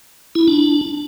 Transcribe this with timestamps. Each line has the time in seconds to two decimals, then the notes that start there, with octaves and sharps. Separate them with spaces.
0.35 E4
0.48 D4